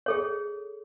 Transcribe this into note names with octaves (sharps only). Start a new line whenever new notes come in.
G#4 A4 C#5